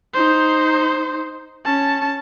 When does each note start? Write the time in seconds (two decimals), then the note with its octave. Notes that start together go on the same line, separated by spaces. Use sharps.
0.14 D#4 C5
1.66 C#4 A5